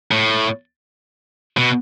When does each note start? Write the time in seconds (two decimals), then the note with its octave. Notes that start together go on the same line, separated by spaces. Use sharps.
0.11 A2
1.57 B2